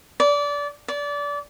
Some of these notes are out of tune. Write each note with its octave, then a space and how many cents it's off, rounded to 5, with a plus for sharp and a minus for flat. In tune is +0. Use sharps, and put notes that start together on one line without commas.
D5 -25
D5 -25